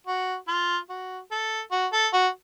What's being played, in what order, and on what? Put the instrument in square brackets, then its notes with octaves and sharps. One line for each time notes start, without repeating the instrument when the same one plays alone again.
[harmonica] F#4
F4
F#4
A4
F#4
A4
F#4